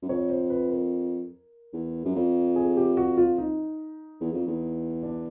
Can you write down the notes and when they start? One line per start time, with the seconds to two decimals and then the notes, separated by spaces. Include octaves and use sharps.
0.03 F#2
0.09 F2 C#5
0.30 C5
0.50 B4
0.70 A#4
1.73 E2
2.05 F#2
2.15 F2
2.56 G#4
2.77 G4
2.97 F#4
3.18 F4
3.38 D#4
4.21 E2
4.33 F2
4.47 E2
5.03 D4